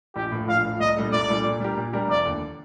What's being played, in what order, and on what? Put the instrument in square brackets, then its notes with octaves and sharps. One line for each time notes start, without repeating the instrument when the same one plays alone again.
[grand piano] A#1 [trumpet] G4
[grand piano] A2 F3
[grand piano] A#1 [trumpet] F5
[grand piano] A2 F3
[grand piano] C2 [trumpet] D#5
[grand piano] A#2 G3 D4 A4
[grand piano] C2 [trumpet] D5
[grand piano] A#2 G3 D4 A4
A#2
G3 D4 G4 A#4
A#2
G3 D4 G4 A#4
[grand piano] F1 [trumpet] D5
[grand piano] D#2 D3